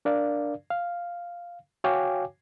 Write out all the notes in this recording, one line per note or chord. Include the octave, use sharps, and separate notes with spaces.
D4 A#4 D5 F5
F5
F#4 C#5 F5 G5 G#5 D6